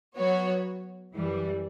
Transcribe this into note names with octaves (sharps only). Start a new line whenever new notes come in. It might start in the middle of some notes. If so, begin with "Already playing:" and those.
F#3 B3 F#4 C#5
F#2 E3 G3